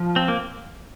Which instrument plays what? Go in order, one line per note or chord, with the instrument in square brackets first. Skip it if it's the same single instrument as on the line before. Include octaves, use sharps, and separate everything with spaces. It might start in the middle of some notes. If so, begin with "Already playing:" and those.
Already playing: [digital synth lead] F3
[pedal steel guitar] C4
A#3